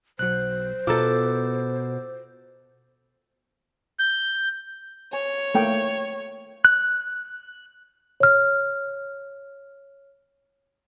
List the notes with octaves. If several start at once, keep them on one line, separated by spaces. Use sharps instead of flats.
B1 F#3 C5 F#6
B2 F4 A4 A#5 D6 E6 A6
G6
C#5 G#5
A3 A#3 G5
F#6
C#5 F6